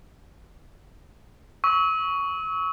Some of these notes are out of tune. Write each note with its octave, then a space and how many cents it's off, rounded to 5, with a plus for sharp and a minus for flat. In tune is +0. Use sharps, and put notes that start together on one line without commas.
C#6 +15 E6 -35